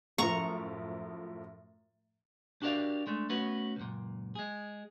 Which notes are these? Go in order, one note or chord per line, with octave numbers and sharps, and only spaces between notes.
F#2 A2 F3 A#5 C#6
D4 F#4 G4 A#4 D5 F5
G#3 A3 D4
A3 B3 C#4 F#4 B4
C#2 F#2 A#2
G#3 G#4